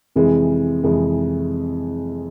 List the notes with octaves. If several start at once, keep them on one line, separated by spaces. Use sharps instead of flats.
F2 C3 E3 G#3
F2 C3 E3 G#3